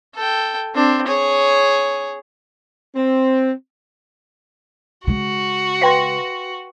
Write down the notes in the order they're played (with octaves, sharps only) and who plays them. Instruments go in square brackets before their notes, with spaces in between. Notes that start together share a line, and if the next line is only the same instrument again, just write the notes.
[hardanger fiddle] A4 G5
C4 D4
G#4 C#5
[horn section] C4
[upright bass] C#3 G#3 [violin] F#4
[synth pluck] B4 A#6 [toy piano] F5 G5 C6